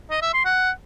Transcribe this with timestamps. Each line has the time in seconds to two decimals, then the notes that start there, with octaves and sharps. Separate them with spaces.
0.10 D#5
0.22 E5
0.34 C6
0.45 F#5